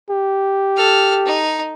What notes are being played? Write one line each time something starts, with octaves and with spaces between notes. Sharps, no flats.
G4
A4 F6
D#4